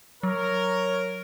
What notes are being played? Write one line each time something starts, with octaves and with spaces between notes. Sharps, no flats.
F#3 A#4 C#5